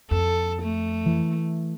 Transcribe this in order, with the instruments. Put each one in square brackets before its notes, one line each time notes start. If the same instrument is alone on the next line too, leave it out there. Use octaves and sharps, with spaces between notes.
[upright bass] F2 [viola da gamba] A4
[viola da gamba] A3
[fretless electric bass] E3